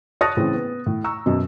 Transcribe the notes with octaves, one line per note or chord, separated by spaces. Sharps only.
C#5 A5 D#6 F#6 A6 A#6
A2 C#3 E3 C4
B3
A2
A#5 C#6 E6
F#2 B2